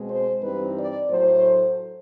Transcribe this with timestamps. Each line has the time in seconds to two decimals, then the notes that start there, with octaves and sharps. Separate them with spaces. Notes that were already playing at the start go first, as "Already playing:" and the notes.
Already playing: B2 G#3 C4
0.08 C5
0.42 G2 E3 G3 C4 D#4 B4
0.77 D5
1.10 A2 F#3 A3 C5